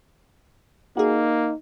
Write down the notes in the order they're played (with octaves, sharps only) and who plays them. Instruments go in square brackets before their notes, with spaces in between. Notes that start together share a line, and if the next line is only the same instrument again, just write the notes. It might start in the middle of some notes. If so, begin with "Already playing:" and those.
[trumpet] A#3 [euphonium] D#4 [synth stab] F#4 G#4